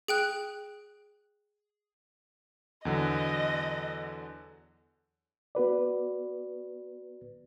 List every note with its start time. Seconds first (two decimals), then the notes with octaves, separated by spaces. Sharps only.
0.08 G#4 G5 F#6
2.85 E2 D3 F#3 D#5
5.55 B3 F#4 B4 D5